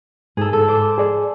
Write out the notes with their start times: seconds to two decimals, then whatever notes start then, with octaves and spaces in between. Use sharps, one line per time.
0.37 G#2 G#4 A4
0.53 A4
0.68 C5 D6
0.98 G#4 D5